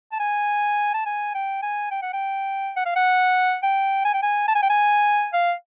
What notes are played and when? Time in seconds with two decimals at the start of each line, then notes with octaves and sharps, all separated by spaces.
0.12 A5
0.20 G#5
0.94 A5
1.06 G#5
1.35 G5
1.62 G#5
1.91 G5
2.02 F#5
2.13 G5
2.76 F#5
2.86 F5
2.96 F#5
3.63 G5
4.05 G#5
4.14 G5
4.23 G#5
4.48 A5
4.55 G#5
4.63 G5
4.70 G#5
5.33 F5